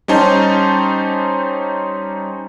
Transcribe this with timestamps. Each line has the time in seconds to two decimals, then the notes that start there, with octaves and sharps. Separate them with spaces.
0.08 G3 C#4 D#4 C5 A5